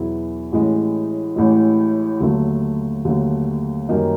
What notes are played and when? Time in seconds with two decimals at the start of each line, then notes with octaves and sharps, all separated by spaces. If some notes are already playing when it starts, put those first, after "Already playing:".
Already playing: E2 B2 F#3 B3 E4
0.52 A1 A2 E3 G#3
1.36 A1 A2 E3 G#3
2.20 D#2 D3 F#3 A3
3.05 D#2 D3 F#3 A3
3.89 F#2 D#3 G3 A#3 D#4